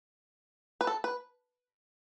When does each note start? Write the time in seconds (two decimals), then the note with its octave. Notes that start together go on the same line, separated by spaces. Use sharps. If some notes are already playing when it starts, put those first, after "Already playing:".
0.81 B4
0.87 A4
1.04 B4